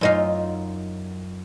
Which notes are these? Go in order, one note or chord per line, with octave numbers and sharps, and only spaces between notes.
F#2 D#4 F4